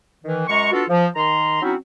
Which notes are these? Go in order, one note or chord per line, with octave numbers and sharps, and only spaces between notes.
D#3 E3
F#2 G#3 A#5 C#6
B3 D4 F4 F#4 A4
F3
D#3 A#5 C6
F#3 C4 C#4 D#4 E4 F#4